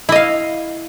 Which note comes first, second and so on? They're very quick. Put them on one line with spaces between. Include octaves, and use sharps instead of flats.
E4 D#5 F5